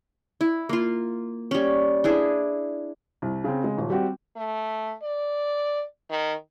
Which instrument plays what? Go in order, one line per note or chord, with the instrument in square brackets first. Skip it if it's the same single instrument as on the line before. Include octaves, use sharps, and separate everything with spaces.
[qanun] E4
A#3 F4
G3 C#4
D4 E4 G#4
[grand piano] C2
C#3 C4
C#3 G#3
D#1
G3 C4 F#4 G4
[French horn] A3
D5
D#3